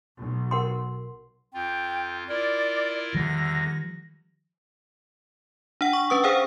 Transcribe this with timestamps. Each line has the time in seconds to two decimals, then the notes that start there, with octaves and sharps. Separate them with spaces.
0.20 B1
0.51 A#4 F#5 C6
1.54 F2 F4 G5
2.29 E4 F4 A#4 D5
3.14 E2 D3 D#3 F3 G3 A#6
5.81 D4 F#5
5.93 C#6
6.10 C#4 B4 D#6
6.24 G#4 C5 F5 G5